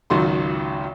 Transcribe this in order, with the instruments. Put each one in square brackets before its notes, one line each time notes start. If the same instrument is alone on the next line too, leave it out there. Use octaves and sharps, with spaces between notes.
[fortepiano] G#1 C#2 D#3 F#3 F4 C6